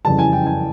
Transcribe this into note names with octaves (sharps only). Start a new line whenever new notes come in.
F#1 F2 C#3 E3 G3 A5
G#5
G5
G#5